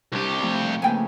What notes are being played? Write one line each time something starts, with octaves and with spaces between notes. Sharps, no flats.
C2 G3 D4 G4 C#6
F2 F3 A3
C#3 A3 A#3 B4 G5 G#5